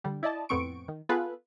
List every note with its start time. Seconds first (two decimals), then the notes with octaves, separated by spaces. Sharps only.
0.04 D3 G3
0.23 E4 D5 D#5 A5
0.49 F2 A2 B3 C4 C#6 D7
0.88 D#3
1.09 B3 F4 G#4 A4 B4